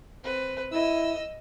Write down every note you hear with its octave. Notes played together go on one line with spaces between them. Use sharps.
C4 B4
E4 D#5 E6